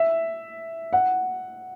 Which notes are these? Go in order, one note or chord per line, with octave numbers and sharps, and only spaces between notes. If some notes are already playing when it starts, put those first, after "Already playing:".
Already playing: E5
F#5